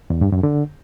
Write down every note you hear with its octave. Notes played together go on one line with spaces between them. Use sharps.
E2
G2
F#2
D3